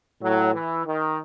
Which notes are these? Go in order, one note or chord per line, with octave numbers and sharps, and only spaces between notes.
A2 F#3
E3
D#3